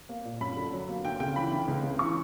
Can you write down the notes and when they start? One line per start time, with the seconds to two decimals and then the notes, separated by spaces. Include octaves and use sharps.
0.09 A#3
0.25 A#2
0.40 F#2 B5
0.56 D3
0.73 F#3
0.89 A#3
1.05 D2 G5
1.20 C#3 G5
1.36 E3 B5
1.52 D2
1.68 C#2
1.83 C#3
1.99 E3 C#6